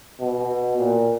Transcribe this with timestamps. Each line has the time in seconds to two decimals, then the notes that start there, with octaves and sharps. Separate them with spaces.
0.21 B2
0.78 A#2